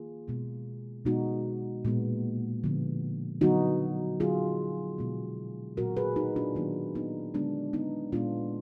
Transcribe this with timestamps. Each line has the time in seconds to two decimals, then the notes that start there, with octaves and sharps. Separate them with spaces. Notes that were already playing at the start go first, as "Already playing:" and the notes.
Already playing: D#3 A#3 F4 G#4
0.28 B2 G#3 B3
1.05 B2 G#3 B3 D#4 F#4
1.85 A#2 G#3 B3
2.64 D3 F3 B3
3.41 D3 F#3 B3 D#4 F#4
4.20 D3 F#3 B3 F4 G#4
4.98 B2 G#3 B3
5.77 A#2 F#3 B3 F#4 A#4
5.97 G#4 B4
6.16 D#4 F#4
6.36 D4 F4
6.55 D#3 F#3 A#3 B3 D#4
6.95 B3 D#4
7.34 D3 G#3 B3 D4
7.73 B3 D#4
8.12 A#2 G#3 B3 D4 F4